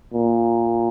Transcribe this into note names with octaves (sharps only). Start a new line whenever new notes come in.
A#2